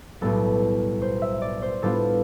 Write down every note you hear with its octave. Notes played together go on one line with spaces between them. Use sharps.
B1 A2 G3 B3 A4
C5
E5
D5
C5
A2 G3 B3 D4 F4 A4